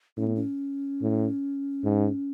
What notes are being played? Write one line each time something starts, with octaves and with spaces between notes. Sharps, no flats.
A2 C#4
B3
C#4
A2
G#2